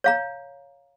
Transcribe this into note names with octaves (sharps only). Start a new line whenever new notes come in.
C#5 F5 A#5